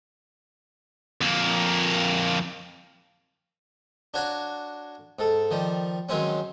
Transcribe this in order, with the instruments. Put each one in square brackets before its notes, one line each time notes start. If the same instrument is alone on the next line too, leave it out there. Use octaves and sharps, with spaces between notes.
[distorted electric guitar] F2 A#3
[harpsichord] D4 F#4 C#5 F5 F#5 A#5
G#2 A4
D#3 F3 G3
D#3 F#3 G#3 C4 C#4